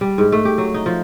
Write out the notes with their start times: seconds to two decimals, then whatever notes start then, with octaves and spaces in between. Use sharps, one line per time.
0.01 G3
0.18 G#2
0.32 A3
0.45 G4
0.58 F#3
0.74 D#4
0.86 F3